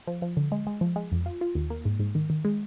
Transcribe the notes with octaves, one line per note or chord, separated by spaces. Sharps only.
F3
F3
D3
G#3
G#3
F3
G#3
F2
F4
F4
D#2
A#3
G#2
G#2
D#3
D#3
G#3